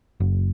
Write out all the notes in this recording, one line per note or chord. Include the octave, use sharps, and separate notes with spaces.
F#1